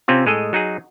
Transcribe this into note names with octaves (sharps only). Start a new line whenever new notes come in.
C3 C4 C#4 F4
A2 G#3 G#4 A4 D#5
F#3 D#4 F#4 G#4